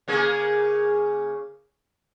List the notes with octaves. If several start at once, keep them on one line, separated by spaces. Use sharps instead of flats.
C#3 A#3 G#4